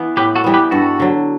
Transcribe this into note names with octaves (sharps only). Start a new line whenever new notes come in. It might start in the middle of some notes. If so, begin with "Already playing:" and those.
Already playing: E3 B3
A2 G4 B4
F#4 A4
E3 G3 B3
G4 B4
G2 F#4 A4
D3 F#3